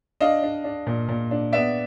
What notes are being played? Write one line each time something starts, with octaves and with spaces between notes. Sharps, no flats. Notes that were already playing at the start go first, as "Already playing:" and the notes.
D4 D#5 F5
D4
D4
A#2
A#2
D4
B3 D5 E5